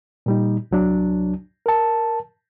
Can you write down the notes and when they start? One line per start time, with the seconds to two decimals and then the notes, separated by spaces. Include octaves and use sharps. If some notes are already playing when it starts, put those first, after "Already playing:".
0.26 A#2 G3 D#4
0.71 C2 F#3 D4
1.66 A#4 A5